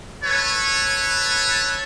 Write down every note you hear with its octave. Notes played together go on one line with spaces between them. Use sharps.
A4 B4 C#5